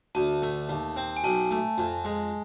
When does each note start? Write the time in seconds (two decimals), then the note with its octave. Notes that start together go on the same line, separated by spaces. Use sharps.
0.15 D2 A5
0.42 A3
0.69 D#2
0.96 C4
1.17 G#5
1.24 B1 A5
1.51 A3
1.78 F2
2.05 G#3